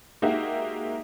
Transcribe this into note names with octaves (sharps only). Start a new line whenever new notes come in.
G#3 A#3 D#4 F#4 G4 E5